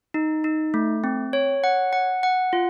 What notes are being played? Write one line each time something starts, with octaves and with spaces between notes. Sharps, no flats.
D#4
D#4
A3
C4
C#5
F#5
F#5
F#5
F4